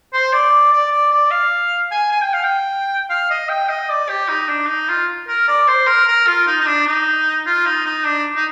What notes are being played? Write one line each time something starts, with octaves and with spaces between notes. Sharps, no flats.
C5
D5
D5
D5
D5
F5
G#5
G#5
G5
F5
G5
F5
D#5
G5
D#5
D5
G4
D#4
D4
D#4
F4
A#4
D5
C5
A#4
A#4
F4
D#4
D#4
D4
D#4
F4
D#4
D#4
D4
D#4